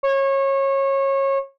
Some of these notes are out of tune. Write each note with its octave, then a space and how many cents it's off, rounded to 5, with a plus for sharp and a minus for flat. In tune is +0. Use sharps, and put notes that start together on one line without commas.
C#5 -25